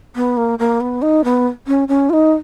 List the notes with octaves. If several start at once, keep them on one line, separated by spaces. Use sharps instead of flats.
B3
A#3
A#3
B3
D#4
B3
C#4
C#4
F4
D#4